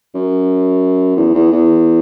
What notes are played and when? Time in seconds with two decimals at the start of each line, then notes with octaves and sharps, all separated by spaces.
0.15 F#2
1.17 E2
1.35 E2
1.52 E2